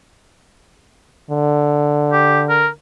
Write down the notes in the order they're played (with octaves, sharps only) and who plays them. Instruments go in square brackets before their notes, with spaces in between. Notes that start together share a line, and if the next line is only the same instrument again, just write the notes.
[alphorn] D3
[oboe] G4
A#4